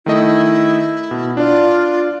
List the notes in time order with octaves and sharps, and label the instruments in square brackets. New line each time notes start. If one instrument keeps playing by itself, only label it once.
[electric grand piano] D#3 A3 D#5 [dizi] E4
[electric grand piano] B2
[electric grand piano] D4 D5 [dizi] F4